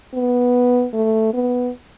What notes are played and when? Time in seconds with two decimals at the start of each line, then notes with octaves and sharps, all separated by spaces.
0.14 B3
0.93 A3
1.34 B3